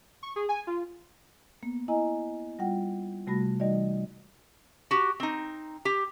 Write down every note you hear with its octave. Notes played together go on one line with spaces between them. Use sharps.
C#6
G#4
G#5
F4
A#3 B3
E4 D#5 G#5 A#5
G3 F4 F#5 G5
C3 G3 A3 F#4 B5 A#6
E3 G3 D#4 F#4 D5 D#5
F#4 G4
C4 D#4
G4